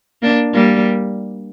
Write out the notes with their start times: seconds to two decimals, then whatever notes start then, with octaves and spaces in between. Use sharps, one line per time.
0.22 A#3 D4
0.53 G3 A#3